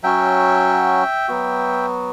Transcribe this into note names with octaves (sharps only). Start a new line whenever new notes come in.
F#3 C#4 F#4 E5 G5
F#3 B3 F#4